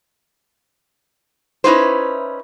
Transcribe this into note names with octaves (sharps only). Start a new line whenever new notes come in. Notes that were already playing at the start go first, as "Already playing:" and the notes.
C#4 D#4 E4 B4 C5